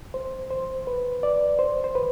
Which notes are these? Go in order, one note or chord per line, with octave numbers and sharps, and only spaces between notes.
C5
C5
B4
D5
C5
C5
B4